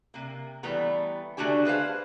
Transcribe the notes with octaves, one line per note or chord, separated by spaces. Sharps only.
C3 A#3
E3 G3 A3 B3 A#5
D3 A3 D4 F#4 G4 G#5
G#4 B4 C5 F5